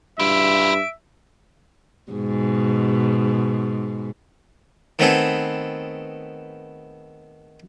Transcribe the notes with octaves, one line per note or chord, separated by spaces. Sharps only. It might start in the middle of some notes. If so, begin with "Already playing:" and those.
G2 E4 F4 E5 D7
G#2 B2
D#3 A3 B3 C4 G#4 A4